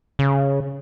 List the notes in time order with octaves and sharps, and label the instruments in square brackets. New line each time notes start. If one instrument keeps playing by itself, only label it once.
[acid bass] C#3